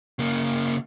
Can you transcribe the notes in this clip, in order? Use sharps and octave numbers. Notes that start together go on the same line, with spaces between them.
C#3 A#3